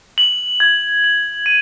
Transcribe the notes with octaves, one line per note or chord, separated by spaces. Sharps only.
F#7
G#6
F#7
D#7